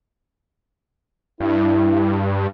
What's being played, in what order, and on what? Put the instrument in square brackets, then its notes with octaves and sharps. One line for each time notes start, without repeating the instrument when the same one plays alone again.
[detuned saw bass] G2 [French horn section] E4